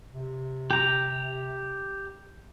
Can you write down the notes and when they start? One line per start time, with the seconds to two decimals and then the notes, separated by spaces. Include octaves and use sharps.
0.12 C3
0.71 G4 A#5